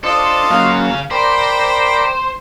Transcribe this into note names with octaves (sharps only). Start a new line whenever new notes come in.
D4 F4 A4 C5 D#5
C#3 F#3 A#3 C#4 F5
A#4 C5 D5 G5 B5